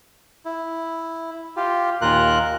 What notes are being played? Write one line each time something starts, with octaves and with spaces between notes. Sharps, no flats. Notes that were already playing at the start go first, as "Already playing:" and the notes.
E4
F4 G4
D#2 A#2 F4 A#4 F#6